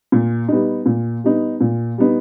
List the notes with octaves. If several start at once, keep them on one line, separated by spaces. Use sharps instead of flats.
A#2
G3 B3 D#4
A#2
G3 B3 D#4
A#2
G3 B3 D#4